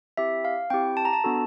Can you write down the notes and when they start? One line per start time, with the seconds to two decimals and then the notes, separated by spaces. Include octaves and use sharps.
0.17 C4 E4 G4 E5
0.45 F5
0.70 C4 E4 G4 G5
0.97 A5
1.05 A#5
1.13 A5
1.24 B3 D4 F#4 A4